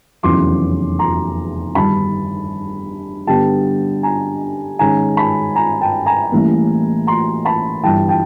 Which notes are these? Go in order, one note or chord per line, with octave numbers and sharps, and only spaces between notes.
F1 E2 C#3 F#3 B3 C6 D6
A#5 C6
G1 G2 D#3 A5 B5
G2 D3 G3 B3 D4 G5 A5
G#5 A#5
G#2 D#3 G#3 C#4 G#5 A#5
A5 B5
G#5 A#5
G5 A5
G#5 A#5
A1 A2 E3 G3 A#3
A#5 C6
A5 B5
G1 G2 E3 G5 A5
G5 A5